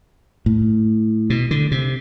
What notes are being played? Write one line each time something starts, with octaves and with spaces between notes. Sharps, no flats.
A2
B2
D3
C3